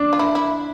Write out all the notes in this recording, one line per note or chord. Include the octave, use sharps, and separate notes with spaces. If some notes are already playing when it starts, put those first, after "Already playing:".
Already playing: D4
F4
E4
E4